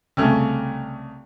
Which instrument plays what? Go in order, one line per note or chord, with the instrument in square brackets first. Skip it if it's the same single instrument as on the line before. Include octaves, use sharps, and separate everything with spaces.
[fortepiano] C2 C#3 A3